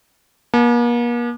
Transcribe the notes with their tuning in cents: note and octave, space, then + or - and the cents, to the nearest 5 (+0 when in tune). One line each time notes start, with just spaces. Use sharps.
A#3 +45 A5 -40